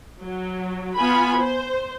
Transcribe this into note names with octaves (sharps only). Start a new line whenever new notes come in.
F#3
B3 F4 G#5 B5
C5